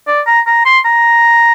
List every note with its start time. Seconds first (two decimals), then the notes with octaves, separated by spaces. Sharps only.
0.07 D5
0.27 A#5
0.47 A#5
0.65 C6
0.85 A#5